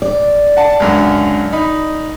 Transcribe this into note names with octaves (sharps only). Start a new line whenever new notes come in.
D5
F#5 A5
C#2 F#2 D3
D#4 B5